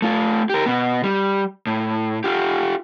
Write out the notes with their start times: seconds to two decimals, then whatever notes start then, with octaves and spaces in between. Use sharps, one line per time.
0.02 A3 F4
0.50 G4 A#4
0.66 B2 B3
1.03 G3
1.67 A2
2.24 F4 G4